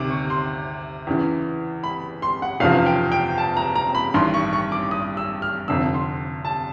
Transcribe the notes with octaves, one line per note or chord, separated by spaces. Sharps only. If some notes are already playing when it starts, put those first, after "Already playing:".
Already playing: D2 C3 D#3 D6
C#6
C6
E2 C#3 E3
B5
C6
F#5
F1 E2 C#3 F3 F5
G5
G5
A5
A#5
A#5
B5
A1 G2 D#3 C6
C#6
C#6
D6
D#6
E6
F6
F1 F2 D3 E6
C6
A5